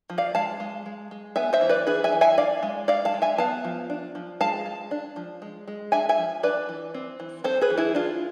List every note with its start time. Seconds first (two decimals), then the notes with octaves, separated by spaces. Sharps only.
0.10 F3
0.18 D5 F5
0.35 G#3 F5 A5
0.60 G#3
0.86 G#3
1.11 G#3
1.36 B3 E5 G#5
1.53 C5 E5
1.61 E3
1.69 B4 D5
1.86 D4 G#4 B4
2.04 E5 G#5
2.12 E3
2.21 E5 G#5
2.38 D4 D5 F5
2.63 G#3
2.88 G#3 D5 F5
3.05 F5 A5
3.14 G#3
3.22 E5 G#5
3.38 B3 F5 A5
3.64 F3
3.90 D4
4.15 F3
4.40 G#3 F5 A5
4.66 G#3
4.91 D4
5.16 F3
5.42 G#3
5.68 G#3
5.92 D4 E5 G#5
6.09 E5 G#5
6.18 F3
6.43 D4 B4 D5
6.69 E3
6.94 C4
7.20 E3
7.44 C4 A4 C5
7.61 G#4 B4
7.70 E3
7.78 E4 G#4
7.95 D4 F4